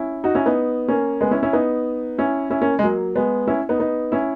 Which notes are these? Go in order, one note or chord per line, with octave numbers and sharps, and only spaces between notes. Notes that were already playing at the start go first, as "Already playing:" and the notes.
Already playing: C#4 E4
D#4 F#4
C#4 E4
B3 D#4
A#3 C#4
G#3 B3
C#4 E4
C#4 E4
B3 D#4
C#4 E4
C#4 E4
A#3 C#4
G#3
F#3 A#3
G#3 B3
C#4 E4
B3 D#4
B3 D#4
C#4 E4